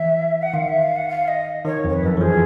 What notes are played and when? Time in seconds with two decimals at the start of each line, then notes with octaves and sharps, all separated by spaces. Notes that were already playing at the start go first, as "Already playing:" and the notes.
Already playing: E3 E5
0.42 F#5
0.54 D#3 F5
0.68 E5
0.83 F5
0.96 F#5
1.09 F5
1.28 D#5
1.65 D#3 C#5
1.84 F2 F3 A#4
1.93 B4
2.03 F#2 F#3 A4
2.17 E3
2.21 F3 G#4